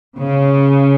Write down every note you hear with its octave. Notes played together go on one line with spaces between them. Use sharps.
C#3